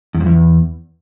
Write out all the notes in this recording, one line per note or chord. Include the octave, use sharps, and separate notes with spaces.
E2
F2
E2